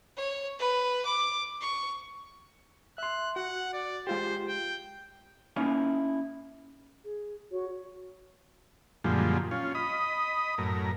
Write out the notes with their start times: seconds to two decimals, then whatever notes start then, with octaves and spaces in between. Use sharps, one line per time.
0.17 C#5
0.59 B4
1.05 D6
1.61 C#6
2.98 E5 C6 F#6
3.36 F#4 F#5
3.73 D5
4.07 G#3 F4 G4 C5
4.48 G5
5.56 A#3 C#4 D#4 E4 F5
7.04 G#4
7.52 F#4 C#5
9.04 F#2 A#2 D3 F3 G3 G#3
9.51 C#4 F4
9.75 D#5 B5 D#6
10.58 F#2 A2 A#4